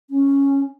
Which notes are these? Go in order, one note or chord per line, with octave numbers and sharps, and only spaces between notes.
C#4